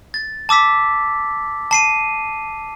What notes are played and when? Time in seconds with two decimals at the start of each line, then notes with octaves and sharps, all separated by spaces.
0.14 A6
0.49 A5 D6 E6 B6
1.71 A5 C7 D#7